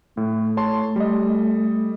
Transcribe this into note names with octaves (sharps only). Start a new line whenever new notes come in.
A2 A3
C#5 A5 C6
G3 D#5